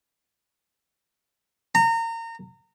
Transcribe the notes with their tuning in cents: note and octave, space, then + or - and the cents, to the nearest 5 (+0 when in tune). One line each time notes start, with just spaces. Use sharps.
A#5 -30